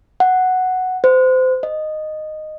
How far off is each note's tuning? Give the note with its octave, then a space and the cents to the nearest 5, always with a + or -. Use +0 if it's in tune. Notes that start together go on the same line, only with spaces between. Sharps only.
F#5 +0
C5 -25
D#5 -10